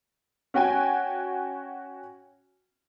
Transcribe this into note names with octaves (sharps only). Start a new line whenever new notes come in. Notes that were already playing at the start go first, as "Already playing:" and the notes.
C#4 F#4 G5 G#5